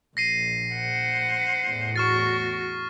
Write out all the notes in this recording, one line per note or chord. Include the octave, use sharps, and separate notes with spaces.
A#1 A#6 C7 D#7
C5 F#5
E2 A2
F#4 C#6 F6 A6